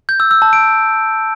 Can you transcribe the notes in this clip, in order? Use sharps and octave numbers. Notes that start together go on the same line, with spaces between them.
G6
E6
E6
A5
D7